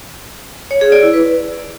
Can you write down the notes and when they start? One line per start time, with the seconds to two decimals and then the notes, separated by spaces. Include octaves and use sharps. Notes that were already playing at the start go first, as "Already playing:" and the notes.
0.71 C#5
0.81 G#4
0.92 D5
1.03 E4
1.13 B4